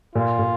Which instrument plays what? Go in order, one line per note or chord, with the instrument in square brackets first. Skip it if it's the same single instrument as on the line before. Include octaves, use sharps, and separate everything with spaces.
[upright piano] A#2 [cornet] F4
[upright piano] A#2